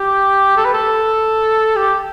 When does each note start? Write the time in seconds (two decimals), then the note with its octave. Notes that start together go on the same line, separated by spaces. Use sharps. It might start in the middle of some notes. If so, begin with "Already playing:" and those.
Already playing: G4
0.57 A4
0.65 B4
0.74 A4
1.76 G4